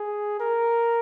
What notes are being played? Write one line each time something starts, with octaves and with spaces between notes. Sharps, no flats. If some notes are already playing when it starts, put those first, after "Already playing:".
Already playing: G#4
A#4